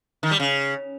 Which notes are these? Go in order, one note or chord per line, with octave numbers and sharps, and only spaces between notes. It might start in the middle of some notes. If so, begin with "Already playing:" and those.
D#3
G3
C#3